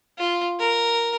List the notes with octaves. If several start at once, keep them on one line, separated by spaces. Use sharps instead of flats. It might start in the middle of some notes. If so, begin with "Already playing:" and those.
F4
A#4